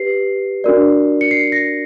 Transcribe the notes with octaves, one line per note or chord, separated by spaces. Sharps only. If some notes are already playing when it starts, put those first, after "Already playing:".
Already playing: G4 B4 C7
D4 F#4 A#4 D5
C#7
C7
A#6